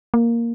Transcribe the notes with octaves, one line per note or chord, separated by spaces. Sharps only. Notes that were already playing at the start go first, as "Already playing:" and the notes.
A#3